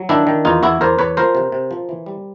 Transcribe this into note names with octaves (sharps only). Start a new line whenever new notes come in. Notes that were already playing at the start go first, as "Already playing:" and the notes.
Already playing: F#3
D#3 D4 E4
D#3
E2 D#4 F4
E2 E4 F#4
E2 A#4 C5
E2 B4 C#5
F3 A#4 C5
C3
C3
F3
E3
G3